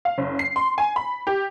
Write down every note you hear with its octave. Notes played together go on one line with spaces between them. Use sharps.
F5
F#1
C7
C6
G#5
B5
G4